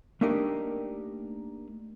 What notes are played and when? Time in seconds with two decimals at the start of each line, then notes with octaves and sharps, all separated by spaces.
0.21 A3 A#3 D4 D#4 G4 A#4